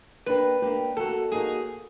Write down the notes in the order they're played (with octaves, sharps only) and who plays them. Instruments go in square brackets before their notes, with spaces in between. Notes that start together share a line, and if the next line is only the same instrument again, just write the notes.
[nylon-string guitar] A#3 D4 G4 [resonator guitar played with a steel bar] B4
[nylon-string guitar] A#3 D4 G4
[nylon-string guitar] A#3 D#4 F#4 [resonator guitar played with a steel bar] A4
[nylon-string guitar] A#3 D#4 F#4 [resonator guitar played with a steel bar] G#4